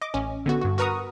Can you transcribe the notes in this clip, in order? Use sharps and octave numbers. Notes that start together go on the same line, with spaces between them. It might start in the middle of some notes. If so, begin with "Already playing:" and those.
D#5 D6
A1 C#4
D3 B3 F#4
G2 F#4
F#4 A#4 B4 A#5 C#6 D#6